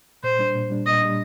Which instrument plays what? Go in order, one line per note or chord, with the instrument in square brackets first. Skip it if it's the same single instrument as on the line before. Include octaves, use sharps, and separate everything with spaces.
[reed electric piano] A#2 [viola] C5
[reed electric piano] G3 D4
A#2
G3 D4
[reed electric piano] A#2 [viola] D#5
[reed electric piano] G3 D4